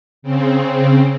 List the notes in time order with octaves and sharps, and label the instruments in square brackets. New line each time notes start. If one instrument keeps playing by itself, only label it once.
[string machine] C#3 C4